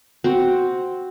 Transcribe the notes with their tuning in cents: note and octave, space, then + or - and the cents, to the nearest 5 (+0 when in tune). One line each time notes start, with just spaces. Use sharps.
C4 +0 F#4 +0